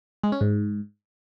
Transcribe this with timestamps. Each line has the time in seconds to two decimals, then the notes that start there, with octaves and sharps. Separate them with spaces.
0.23 G#3
0.32 C#4
0.41 G#2